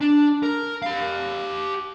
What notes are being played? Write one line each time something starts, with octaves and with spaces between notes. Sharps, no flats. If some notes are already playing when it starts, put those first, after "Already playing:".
D4
A#4
G4 F5